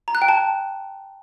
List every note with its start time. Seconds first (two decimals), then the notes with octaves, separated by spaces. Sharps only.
0.08 A#5
0.15 F#6
0.22 G5
0.29 A5